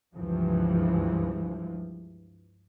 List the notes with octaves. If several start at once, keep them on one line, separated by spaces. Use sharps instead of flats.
C#2 G2 E3 F3